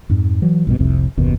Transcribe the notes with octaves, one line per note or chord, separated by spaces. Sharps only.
F2 G#2
E3 F#3
A#1 G2 B2
F1 C2 F2 C3
F#1 D#2 B2